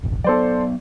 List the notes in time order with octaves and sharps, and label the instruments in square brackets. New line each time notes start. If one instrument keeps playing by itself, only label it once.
[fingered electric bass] E1 A1
[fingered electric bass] F#3 B3 [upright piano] A4 C5 D5